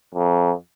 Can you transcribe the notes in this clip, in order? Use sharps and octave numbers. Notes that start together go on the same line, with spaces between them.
F2